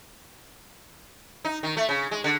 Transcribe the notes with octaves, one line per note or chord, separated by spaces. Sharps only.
D#4
D#3
A3
C#3
G#3
D3